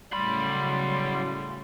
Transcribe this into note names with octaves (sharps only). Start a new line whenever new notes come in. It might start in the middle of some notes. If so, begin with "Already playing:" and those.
A2 C#3 F#3 G3 B5 C6